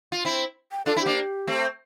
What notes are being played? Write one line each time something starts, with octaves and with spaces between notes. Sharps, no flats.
F4
C4 E4
G5
D4 F4 A4
C4 E4
A#3 D4 G4
A3 C4